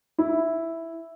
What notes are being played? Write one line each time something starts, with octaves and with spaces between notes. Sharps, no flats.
E4